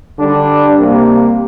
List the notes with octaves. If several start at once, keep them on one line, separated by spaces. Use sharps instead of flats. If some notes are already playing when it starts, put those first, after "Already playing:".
D3 G3 D4
C3 G3 A#3